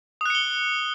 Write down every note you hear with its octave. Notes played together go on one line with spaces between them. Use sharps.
D#6 F#6 C#7 G7